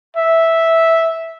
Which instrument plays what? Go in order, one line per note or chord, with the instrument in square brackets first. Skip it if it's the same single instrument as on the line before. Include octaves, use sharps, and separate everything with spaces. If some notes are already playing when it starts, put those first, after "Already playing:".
[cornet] E5